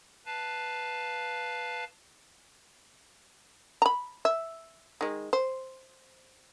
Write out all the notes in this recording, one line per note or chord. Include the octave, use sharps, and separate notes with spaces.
B4 F5 A5
A#5 B5
E5
D#3 G#3
C5